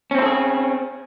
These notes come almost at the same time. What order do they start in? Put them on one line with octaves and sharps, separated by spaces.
C#4 C4 E4 A4 G#4